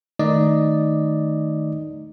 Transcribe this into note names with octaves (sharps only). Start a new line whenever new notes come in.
D#3 A3 D#4 D5 D#5